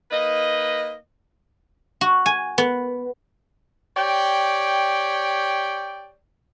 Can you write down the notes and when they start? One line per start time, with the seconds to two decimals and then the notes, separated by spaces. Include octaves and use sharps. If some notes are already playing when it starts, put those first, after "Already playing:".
0.11 A#3 D#4 B4 D#5
2.01 F#4
2.26 G#5
2.58 B3
3.97 G4 C#5 D5 G5